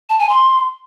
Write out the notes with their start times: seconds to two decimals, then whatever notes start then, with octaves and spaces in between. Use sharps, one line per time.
0.09 A5
0.19 G#5
0.29 C6